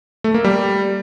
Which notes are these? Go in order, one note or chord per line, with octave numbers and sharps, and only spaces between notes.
A3
A#3
G3